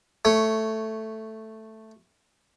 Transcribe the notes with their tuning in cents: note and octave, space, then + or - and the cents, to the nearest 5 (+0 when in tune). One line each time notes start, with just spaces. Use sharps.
A3 +0 C#5 +0